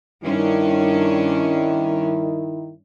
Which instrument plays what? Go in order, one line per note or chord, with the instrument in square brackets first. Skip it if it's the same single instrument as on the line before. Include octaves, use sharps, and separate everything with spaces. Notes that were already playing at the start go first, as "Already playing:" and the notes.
[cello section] G2 C#4 D4 [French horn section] D#3 E4